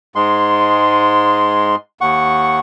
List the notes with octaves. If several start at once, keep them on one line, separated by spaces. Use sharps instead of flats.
G#2 G#3 C6
D#2 F#5 C#6